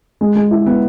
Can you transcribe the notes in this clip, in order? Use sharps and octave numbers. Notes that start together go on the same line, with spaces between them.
G#3
G#3
E4
B3